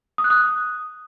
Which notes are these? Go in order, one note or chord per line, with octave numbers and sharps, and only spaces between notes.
D#6
F#6
D#6